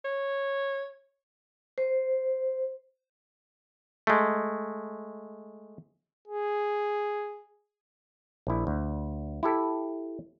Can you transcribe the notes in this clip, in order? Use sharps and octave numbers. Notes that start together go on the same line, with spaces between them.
C#5
C5
G#3 A3
G#4
A#1 E4
D2
E4 G4 A4